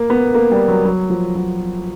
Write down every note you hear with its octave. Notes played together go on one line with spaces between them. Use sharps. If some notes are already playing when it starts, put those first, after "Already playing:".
Already playing: A#3
B3
A#3
G3
F#3
F#3
F3
F#3